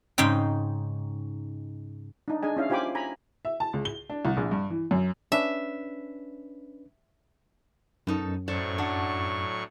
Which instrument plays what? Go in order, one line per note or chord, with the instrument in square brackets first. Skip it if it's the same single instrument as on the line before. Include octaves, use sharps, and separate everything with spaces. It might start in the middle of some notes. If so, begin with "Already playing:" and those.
[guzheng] G#2 C#3 D#4 G5
[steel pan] D4 D#4
D4 G#4 D#5 G#5
C#4 E4 F5
F4 G4 C5 G#5 B5 D6
G#5 A#5 B5
[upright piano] E5
A5
C#2
G7
D4
C2
A#1
G2
E3
F#2
[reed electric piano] C#4 D4 B4 [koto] E5
[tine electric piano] F#2 [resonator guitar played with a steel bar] B2 D#4 A4
[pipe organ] A2 F#3 C#6 [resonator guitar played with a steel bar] A4 C5 D5
[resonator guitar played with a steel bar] D4 F#5